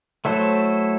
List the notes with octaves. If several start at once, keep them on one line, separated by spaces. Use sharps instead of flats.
F#3 A3 E4 A4 C5